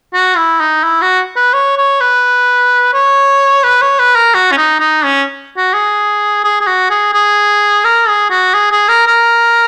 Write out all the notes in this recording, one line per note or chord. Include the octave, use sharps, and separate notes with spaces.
F#4
E4
D#4
E4
F#4
B4
C#5
C#5
B4
C#5
B4
C#5
B4
A#4
F#4
C#4
D#4
D#4
C#4
F#4
G#4
G#4
G#4
F#4
G#4
G#4
A#4
G#4
F#4
G#4
G#4
A#4
A#4